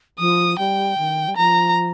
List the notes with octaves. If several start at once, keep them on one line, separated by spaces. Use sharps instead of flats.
F3 D#6
G3 G5
D#3
G3
F3 A#5